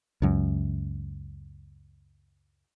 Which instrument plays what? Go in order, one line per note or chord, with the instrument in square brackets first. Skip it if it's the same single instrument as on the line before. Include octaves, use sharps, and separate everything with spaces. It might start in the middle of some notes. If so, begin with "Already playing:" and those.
[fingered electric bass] C#2 F#2